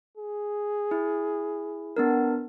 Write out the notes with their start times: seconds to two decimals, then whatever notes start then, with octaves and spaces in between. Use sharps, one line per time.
0.17 G#4
0.91 E4
1.97 B3 D4 A#4